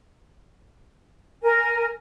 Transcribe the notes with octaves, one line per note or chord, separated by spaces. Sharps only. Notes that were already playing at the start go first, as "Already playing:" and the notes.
A#4 G#5